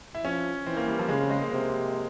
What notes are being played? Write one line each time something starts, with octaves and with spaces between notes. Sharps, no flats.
E4
F3 C#4
E3 C4
A#3
G3
F3
C#3 G#3
C4
G#3
A#3
C3 C4